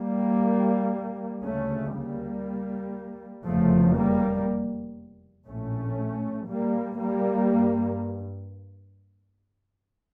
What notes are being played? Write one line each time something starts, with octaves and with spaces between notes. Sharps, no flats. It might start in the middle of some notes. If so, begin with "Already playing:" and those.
Already playing: G3 A#3
D2 C#3 A3 C#4
G3 A#3
F1 E2 C#3 F3 A3
G3 A#3
A#1 A2 A3 C#4
G3 A#3
G3 A#3
G2